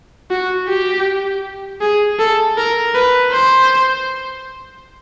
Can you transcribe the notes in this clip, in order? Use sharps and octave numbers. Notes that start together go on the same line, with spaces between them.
F#4
G4
G#4
A4
A#4
B4
C5